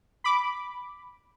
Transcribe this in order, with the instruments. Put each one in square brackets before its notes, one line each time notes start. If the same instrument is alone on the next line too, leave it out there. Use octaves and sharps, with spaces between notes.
[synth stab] B5 D6